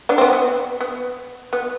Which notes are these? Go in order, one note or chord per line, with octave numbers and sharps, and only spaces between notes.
B3 D4
C4
B3
B3
B3
B3